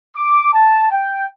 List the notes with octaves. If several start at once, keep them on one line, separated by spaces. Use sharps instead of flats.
D6
A5
G5